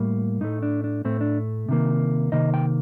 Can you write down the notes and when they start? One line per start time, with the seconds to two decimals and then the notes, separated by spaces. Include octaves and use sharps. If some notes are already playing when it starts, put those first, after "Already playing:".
Already playing: A2 G3 A#3
0.41 A2 A3 D#4
0.63 D4
0.84 D4
1.05 A2 A3 C4
1.21 D4
1.69 C3 D#3 A#3
2.32 C3 D#3 A#3 D#5
2.54 G5